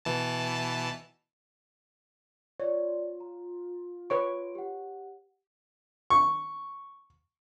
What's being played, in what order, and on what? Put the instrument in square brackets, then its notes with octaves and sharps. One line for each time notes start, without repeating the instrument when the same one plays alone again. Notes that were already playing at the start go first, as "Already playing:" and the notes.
[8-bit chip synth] B2 E3 A5
[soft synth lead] F4 [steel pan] C#5 [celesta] D5
[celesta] A#5
[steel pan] B4 C#5 C#6 [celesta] D7
[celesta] G4 F#5
[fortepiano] C#6